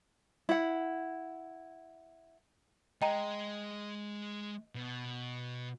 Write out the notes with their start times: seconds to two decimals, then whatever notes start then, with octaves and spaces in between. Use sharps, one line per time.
0.49 E4 F#5
3.02 G#3 D#5 G5 A#5
4.75 B2